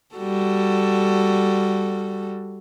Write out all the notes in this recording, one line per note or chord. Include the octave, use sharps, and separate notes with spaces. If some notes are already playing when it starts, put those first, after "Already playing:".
G3 F#4 A4